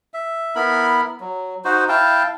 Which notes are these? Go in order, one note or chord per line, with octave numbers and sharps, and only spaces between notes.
E5
B3 E4 A#4 B5
F#3
D#4 F#4 C5
E4 F5 G5 A5